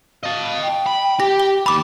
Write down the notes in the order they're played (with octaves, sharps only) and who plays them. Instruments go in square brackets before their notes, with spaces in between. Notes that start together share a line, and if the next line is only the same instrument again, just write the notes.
[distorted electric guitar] D#5 A5 [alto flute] F5
[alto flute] G5
[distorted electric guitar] B5
[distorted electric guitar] G4 [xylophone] A#6
[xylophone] G7
[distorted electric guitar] D#2 A5 [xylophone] B5 D6